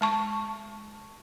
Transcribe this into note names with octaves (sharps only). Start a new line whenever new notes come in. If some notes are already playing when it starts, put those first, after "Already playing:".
G#3 A5 C#6